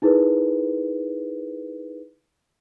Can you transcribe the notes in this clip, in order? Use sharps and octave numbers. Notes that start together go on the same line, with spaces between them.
D#4 E4 G#4 A#4 B4